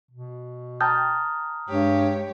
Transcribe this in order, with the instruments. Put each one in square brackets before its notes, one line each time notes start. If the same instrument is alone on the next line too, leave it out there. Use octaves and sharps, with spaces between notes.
[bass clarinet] B2
[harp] G5 A5 A#5 [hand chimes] D#6 F6 G6
[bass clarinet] G2 [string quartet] G#3 G4 C#5